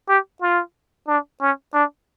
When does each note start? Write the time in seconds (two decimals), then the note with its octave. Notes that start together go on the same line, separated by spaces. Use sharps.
0.09 G4
0.41 F4
1.08 D4
1.41 C#4
1.74 D4